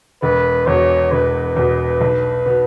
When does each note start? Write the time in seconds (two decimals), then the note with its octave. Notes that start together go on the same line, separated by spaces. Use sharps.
0.22 E1 B4
0.67 E2 B2 C#5
1.12 E1 B4
1.56 E2 B2
2.01 B1
2.46 B2 B3